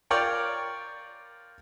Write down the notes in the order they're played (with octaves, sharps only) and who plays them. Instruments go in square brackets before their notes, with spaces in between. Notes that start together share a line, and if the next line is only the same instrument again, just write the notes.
[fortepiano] F4 A#4 C#5 D5 G5